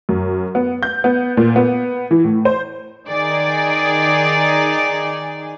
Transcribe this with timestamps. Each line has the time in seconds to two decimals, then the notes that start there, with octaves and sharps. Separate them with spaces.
0.09 F#2
0.55 B3
0.83 G6
1.04 B3
1.37 A#2
1.56 B3
2.11 E3
2.24 A2
2.45 C5
3.07 D#3 D#4 G#4 D5